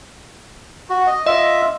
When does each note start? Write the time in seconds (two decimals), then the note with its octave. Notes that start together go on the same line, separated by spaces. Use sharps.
0.90 F#4
1.07 D#5
1.26 F4 D#5 E5